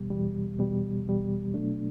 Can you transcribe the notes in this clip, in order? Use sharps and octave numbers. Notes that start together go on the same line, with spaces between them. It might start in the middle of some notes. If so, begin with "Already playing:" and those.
Already playing: E2 B2 G3
E2 B2 G3
E2 B2 G3
E2 B2 G3
B2 F#3 A3 D4